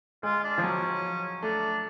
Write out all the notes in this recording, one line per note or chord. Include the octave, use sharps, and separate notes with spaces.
G#3 F4
D4
F3
F#3 C#4
A3 D4